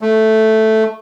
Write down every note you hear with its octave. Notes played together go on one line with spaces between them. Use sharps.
A3